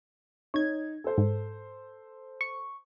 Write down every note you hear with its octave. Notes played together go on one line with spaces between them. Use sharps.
D#4 C#5 G#6
A4 C5
G#2
C#6